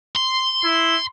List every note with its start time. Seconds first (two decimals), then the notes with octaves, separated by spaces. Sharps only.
0.15 C6
0.64 E4